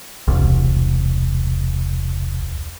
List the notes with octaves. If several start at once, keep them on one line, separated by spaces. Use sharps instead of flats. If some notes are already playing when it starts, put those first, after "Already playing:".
E1 C2